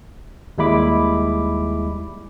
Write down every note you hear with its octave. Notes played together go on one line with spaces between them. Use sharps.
D#2 G3 G#3 E4 B5 D6